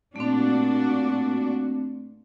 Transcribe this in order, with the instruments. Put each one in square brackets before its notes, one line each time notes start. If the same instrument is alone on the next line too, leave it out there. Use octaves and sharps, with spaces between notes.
[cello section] A#2 D4 F#4 [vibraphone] A3 C4